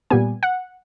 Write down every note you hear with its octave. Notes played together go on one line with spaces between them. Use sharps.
A#2 G3 B3 G#5
F#5